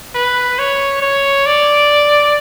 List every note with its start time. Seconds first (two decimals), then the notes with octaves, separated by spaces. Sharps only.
0.15 B4
0.59 C#5
1.02 C#5
1.46 D5